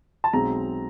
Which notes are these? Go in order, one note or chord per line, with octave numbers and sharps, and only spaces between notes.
A5
B1 B2 G#3 C4 A#5